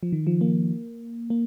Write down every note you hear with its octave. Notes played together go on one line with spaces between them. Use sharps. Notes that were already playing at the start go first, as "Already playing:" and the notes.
F3
D#3
F3
A#3
A#3